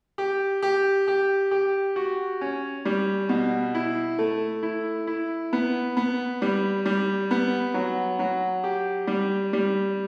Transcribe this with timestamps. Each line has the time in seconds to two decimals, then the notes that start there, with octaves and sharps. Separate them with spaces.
0.18 G4
0.62 G4
1.08 G4
1.51 G4
1.96 F#4
2.41 C#4
2.85 G3
3.29 B2
3.75 E4
4.19 A3
4.63 E4
5.07 E4
5.53 B3
5.97 B3
6.42 G3
6.86 G3
7.31 B3
7.74 F#3
8.19 F#3
8.64 G4
9.07 G3
9.53 G3